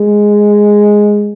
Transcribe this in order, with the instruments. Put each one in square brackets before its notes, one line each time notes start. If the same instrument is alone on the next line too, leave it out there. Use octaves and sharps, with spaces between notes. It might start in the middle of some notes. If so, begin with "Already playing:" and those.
Already playing: [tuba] G#3